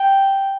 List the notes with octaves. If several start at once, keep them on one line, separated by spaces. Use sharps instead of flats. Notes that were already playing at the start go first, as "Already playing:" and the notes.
Already playing: G5